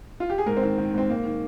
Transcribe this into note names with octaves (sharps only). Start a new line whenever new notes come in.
F4
G4
G#4
G#2 A#4
C4
D#3
D#3
G#2 C4
G#2 A#3
D#3